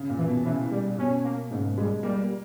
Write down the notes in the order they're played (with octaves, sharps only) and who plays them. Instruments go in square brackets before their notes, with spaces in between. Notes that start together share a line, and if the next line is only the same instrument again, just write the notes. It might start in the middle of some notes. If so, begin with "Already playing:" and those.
Already playing: [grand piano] C#3
A#2
[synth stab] E3
[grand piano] B2
[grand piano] C#3 [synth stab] E3
[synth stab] G3
[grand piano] B2 [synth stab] C#4
[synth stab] A#3
[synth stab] G#2 [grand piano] C#3
[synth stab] G3 [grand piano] G#3
[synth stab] G3 [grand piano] A#3
[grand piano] A#3